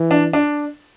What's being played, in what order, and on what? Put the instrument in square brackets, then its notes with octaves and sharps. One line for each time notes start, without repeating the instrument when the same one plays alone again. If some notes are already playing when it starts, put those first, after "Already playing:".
Already playing: [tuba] E3
[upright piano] D4
D4